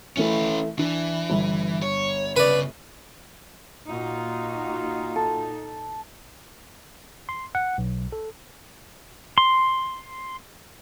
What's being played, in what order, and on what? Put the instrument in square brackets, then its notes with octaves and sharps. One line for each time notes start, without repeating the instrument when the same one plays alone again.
[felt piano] E3 A3 [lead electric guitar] C#4 B4
[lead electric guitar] E3 [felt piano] D4
[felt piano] G1
[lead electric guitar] C#5
[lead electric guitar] C#3 [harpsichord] B4 D5
[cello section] A#2 D#4 [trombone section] F4 F#4
[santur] A4
[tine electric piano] C6
F#5
B1
A4
[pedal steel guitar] C6